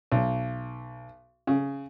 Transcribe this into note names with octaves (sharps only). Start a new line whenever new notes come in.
B1
C#3